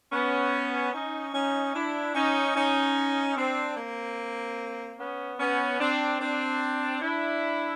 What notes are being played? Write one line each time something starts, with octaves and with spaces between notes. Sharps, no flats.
B3 C#4
C#4 D#4
C#4 D#4
D4 E4
C#4 D#4
C#4 D#4
C4 D4
A#3 C4
B3 C#4
B3 C#4
C4 D4
C4 D4
D4 E4